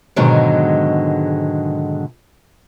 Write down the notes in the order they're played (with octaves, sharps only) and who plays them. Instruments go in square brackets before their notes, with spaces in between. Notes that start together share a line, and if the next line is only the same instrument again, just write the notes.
[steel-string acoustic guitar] G#2 B2 D3 D#3 F#3 G#3